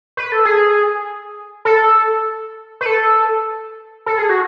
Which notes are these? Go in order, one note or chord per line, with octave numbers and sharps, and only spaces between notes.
B4
A4
G#4
A4
B4
A4
A4
G#4
F#4